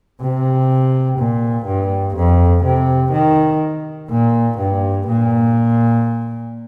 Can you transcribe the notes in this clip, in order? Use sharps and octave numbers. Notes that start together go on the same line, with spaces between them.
C3
A#2
G2
F2
C3
D#3
A#2
G2
A#2